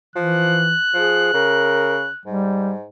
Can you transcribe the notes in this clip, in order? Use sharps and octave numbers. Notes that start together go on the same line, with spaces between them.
E3 F3 F#6
F3 G#4
C#3 A#4
G#2 G3